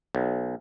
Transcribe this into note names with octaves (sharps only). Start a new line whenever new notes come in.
B1